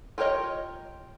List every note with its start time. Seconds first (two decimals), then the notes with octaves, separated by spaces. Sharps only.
0.18 F4 G4 A#4 C#5 D#5